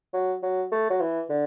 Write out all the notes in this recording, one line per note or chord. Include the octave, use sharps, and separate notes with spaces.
F#3
F#3
A3
F#3
E3
D3